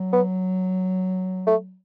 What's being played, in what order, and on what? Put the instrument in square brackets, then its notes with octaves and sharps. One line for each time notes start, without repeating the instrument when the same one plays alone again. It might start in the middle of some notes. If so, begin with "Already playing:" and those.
Already playing: [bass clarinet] F#3
[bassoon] B3
A3